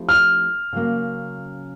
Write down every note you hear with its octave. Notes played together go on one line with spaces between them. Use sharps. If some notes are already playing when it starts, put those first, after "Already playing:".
Already playing: F3 A3 C4 E4 G4
F6
C#3 F#3 A#3